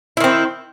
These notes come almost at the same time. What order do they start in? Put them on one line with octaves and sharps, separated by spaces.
E4 D#3 C4